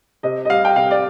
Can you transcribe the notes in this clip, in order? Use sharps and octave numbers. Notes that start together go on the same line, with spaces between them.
C3 D#5
D#5
G3 F5
G5
C3 F5
D5